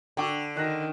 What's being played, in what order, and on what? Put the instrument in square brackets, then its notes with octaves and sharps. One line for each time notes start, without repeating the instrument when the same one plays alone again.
[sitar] D3 [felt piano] G5 C#6 D6
[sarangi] D#3 [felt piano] F#6 A#6